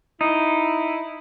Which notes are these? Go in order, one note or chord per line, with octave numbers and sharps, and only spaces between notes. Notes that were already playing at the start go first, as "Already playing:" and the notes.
D#4 E4